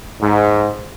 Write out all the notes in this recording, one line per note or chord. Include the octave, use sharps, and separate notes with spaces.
G#2